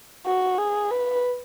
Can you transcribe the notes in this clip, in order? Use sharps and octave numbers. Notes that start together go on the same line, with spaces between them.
F#4
G#4
B4